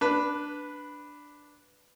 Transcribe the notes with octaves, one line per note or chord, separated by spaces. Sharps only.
D4 B4